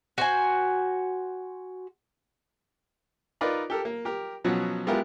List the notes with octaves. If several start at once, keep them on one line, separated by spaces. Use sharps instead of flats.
F#4 C5 G#5
D#4 F4 A#4 B4 D5 D#5
G4 A4 A#4
A#3
G4 A#4
B2 F3 F#3 C#4 F#4
G#3 B3 E4 F4 G4 A#4